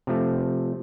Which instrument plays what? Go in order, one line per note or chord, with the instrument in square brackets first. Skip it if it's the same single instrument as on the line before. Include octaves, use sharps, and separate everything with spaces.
[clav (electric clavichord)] C3 F3 A3